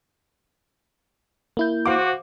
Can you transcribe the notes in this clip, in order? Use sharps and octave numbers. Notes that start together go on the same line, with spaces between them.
A#3 E4 G6
F#4 C5 F5 D6